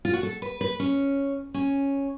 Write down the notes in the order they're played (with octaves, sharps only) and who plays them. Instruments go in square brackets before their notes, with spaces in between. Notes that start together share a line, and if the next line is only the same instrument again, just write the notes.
[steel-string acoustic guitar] F4
F#4
A4
B4
B4
C#4
C#4